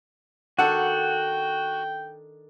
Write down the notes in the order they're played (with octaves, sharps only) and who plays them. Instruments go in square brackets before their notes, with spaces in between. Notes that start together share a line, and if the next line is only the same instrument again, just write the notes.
[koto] D#3 D4 A4 [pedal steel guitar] F#4 [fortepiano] F#5 [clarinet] G5